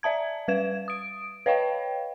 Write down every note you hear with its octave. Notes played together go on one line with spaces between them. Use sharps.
D5 E5 A5 G#6
G3 B4 G#6 E7
D#6 D7
B4 C#5 D#5 F5 G5